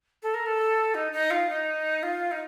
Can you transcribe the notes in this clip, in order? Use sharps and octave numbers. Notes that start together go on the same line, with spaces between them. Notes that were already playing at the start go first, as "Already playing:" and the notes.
A4
A#4
A4
D#4
D#4
F4
D#4
F4
D#4